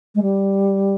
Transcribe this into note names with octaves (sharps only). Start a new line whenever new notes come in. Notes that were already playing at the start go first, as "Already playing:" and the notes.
G#3
G3